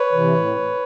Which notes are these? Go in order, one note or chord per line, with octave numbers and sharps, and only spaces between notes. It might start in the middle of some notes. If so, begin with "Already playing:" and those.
Already playing: B4 C#5
C3 E3
A2